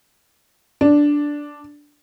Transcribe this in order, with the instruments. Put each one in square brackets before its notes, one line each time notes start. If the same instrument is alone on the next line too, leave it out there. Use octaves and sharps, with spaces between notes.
[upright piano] D4